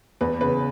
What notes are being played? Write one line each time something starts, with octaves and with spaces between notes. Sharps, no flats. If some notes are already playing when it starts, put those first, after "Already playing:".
E2 B4
C#3 B4